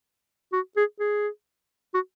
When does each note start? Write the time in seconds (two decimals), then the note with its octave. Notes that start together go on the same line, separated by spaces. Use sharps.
0.53 F#4
0.77 G#4
1.00 G#4
1.94 F#4